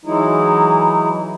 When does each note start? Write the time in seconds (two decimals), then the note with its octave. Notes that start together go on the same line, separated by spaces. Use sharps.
0.05 E3 F#3 G#3 D#4 E4